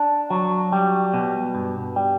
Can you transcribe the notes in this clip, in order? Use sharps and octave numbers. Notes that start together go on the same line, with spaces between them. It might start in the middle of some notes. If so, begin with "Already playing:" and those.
Already playing: D4
F#3
G3
B2
G2
G3